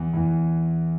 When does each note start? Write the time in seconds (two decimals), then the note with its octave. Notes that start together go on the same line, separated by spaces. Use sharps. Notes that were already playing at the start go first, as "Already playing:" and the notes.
Already playing: E2 E3
0.13 E2 E3